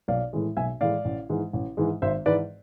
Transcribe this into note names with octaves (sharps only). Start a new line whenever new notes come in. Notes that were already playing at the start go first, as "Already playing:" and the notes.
B1 D5 F5
A2 E3 G#3
B1 E5 G#5
A2 E3 G#3 D5 F5
A1
G#2 E3 G#3
A1
G#2 E3 G#3
G#1 C5 E5
G#2 E3 B4 D5